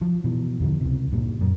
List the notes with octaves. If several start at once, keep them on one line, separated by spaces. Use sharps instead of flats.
F3
B2 E3
E2 D3 F3
C#2 C3
G2 A#2
F#2